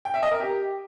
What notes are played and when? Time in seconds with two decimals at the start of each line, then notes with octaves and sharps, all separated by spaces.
0.05 G5
0.14 E5
0.23 D#5
0.31 A#4
0.40 G4